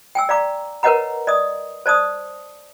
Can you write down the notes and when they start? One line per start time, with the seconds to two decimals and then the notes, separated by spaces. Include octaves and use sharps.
0.15 G5 G#5 E6
0.29 D5 F5 A#5 D6
0.83 A#4 B4 C#5 D#5 F#5 A#5
1.27 D5 D#5 D#6
1.86 C5 D5 A5 D#6